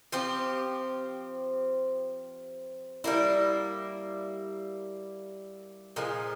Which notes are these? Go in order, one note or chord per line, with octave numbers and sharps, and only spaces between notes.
F3 C4 G4
G3 A#3 E4
A#2 F3 G#3